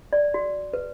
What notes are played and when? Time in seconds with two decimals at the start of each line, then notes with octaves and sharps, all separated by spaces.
0.13 D5
0.34 F#4
0.73 B4